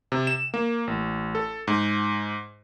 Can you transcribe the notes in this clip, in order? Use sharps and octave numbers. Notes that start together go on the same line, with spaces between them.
C3
E7
A#3
A1
A4
G#2